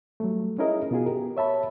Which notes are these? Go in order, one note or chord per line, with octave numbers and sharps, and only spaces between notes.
F#3 G3 A3
C#4 D#4 E4 G#4 A#4 D#5
B2 B3 F4 F#4 G#4
G4 A#4
C#5 E5 A5 B5